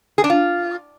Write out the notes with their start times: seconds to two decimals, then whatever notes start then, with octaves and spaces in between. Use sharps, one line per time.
0.18 G#4
0.24 D4
0.30 F4